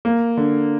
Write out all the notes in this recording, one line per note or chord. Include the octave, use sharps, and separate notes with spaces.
A#3
D3